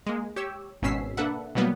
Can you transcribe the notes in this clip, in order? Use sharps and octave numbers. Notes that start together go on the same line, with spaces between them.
G#3 A#3
G4 C#5 E6
G#1 B2 C#4 E6 B6 C7
A#3 D4 A4 B4 E5 F#5
B2 E3 F#3 G3 A#3 B3